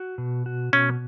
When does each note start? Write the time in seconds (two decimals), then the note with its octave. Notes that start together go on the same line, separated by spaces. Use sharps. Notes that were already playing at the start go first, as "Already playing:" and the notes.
Already playing: F#4
0.18 B2
0.46 F#4
0.73 B2 C#4